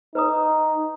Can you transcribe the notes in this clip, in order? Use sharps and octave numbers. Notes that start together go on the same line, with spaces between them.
D#4 B4 A#5 D#6